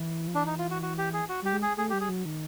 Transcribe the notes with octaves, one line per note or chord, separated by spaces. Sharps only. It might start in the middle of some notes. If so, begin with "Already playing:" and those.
Already playing: E3
F3
E3 D4
D#4
F4
F#4
F#4
G4
G#4
F#4
G3 G4
G#3
G#4
A3 G#4
G3 G4
G#4
F#3
D#3